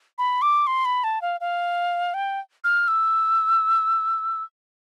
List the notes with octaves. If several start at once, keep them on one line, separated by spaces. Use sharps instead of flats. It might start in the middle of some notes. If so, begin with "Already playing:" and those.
B5
D6
C6
B5
A5
F5
F5
G5
F6
E6